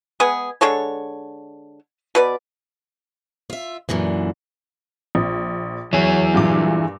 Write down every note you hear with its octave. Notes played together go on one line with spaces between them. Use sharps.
G#3 B3 G#4
D3 G#3 A4 C#5
B2 B4 D5
F4 E5
F#2 A#2 D3 E3
A#1
E3 F#3 G#4 C#5
G2 A#2 D6